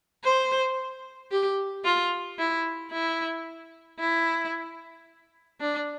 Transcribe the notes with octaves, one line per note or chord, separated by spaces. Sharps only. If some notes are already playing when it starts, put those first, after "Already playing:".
C5
G4
F4
E4
E4
E4
D4